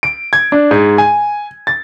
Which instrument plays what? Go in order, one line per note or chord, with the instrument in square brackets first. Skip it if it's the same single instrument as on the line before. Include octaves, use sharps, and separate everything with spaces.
[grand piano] D7
G#6
D4
G#2
G#5
A6